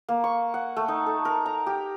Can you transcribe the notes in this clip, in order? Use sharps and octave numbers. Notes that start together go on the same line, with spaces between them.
A#3
C#6
F#5
A3
D#4
A4
A#4
A#5
G4